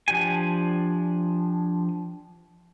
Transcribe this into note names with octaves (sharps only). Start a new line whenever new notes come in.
F3 D4 G4 G#5